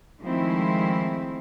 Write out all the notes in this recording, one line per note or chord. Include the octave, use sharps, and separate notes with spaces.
D#3 F3 G#3 A3 C4 E4